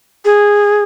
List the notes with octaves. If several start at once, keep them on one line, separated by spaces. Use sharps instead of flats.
G#4